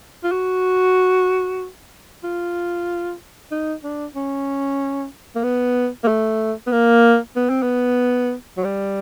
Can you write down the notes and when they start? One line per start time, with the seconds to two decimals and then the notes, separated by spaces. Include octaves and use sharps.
0.24 F4
0.31 F#4
2.23 F4
3.51 D#4
3.83 D4
4.15 C#4
5.35 A#3
5.43 B3
6.03 A#3
6.08 A3
6.67 B3
6.72 A#3
7.36 B3
7.49 C4
7.62 B3
8.57 F#3
8.64 G3